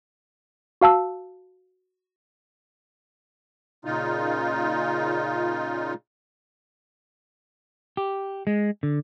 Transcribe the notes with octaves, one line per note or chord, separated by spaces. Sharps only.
F#4 F5 A5 E6
A#2 C#3 D#4 F4
G4
G#3
D3